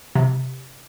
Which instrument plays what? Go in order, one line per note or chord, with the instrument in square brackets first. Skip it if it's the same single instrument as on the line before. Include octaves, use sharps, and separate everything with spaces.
[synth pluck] C3